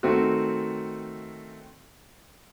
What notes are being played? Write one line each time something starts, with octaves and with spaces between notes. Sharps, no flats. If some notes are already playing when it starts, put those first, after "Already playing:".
D#3 A3 C4 F#4